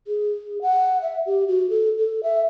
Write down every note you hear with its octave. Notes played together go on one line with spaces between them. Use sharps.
G#4
F#5
E5
G4
F#4
A4
A4
E5